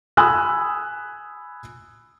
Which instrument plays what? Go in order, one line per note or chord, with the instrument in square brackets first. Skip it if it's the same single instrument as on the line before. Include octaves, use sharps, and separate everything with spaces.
[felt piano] G#5 B5 D#6 E6 F#6